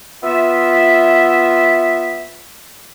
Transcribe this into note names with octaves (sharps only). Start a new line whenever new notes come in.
B3 F4 E5